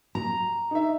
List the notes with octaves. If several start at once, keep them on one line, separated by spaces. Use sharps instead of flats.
A#5
D#4 E5